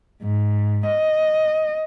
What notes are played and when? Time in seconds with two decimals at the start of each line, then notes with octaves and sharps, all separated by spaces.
0.24 G#2
0.86 D#5